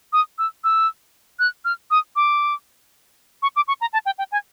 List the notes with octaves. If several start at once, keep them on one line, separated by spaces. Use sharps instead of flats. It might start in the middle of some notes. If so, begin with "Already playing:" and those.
D#6
E6
E6
F#6
F6
D#6
D6
C#6
D6
C#6
A#5
A5
G5
G5
G#5